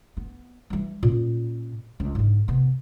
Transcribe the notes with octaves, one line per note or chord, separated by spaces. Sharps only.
B3
E3 G3
A#2 C#4
C#2
G#2 D3
C3 B3